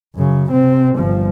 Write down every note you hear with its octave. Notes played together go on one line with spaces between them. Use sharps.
F#2 C#3
C3 C4
G1 F3